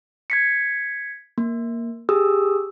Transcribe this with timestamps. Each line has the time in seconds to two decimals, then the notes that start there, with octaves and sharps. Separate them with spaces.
0.30 G#6 B6 C#7
1.38 A#3
2.09 G4 G#4 D#6 E6